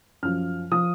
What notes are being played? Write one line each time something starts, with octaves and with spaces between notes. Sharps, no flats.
F#2 F3 F6
F3 D#6